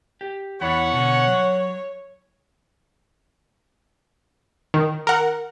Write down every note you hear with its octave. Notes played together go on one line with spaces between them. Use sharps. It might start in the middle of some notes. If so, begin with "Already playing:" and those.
G4
E2 E4 C#5 F#5 B5
B2 D3
F#3
D#3
A#4 F#5